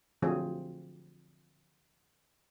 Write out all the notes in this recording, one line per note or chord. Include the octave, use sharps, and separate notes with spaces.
D3 F3 F#3 A3 C4 G#4